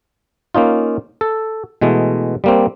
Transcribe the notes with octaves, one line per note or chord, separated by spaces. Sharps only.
A#3 C#4 D#4 F4
A4
B2 E3 G#3 A3
G3 A#3 C4